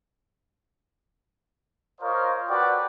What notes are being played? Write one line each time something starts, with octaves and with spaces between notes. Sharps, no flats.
F4 A#4 C5 C#5 D#5 F5
F#4 A4 B4 D5 G5